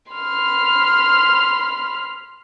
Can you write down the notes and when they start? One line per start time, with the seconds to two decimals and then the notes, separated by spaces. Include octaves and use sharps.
0.10 B5 C6 F6